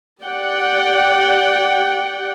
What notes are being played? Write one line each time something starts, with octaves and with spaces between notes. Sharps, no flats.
G4 D5 F#5 G5